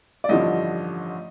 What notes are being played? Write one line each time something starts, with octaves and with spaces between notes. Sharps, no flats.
D5
A1 G2 D3 F3 D#5